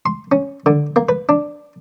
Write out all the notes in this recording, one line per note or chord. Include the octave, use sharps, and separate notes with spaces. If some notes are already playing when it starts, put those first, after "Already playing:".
C6
C#4
D3
A#3
B4
D4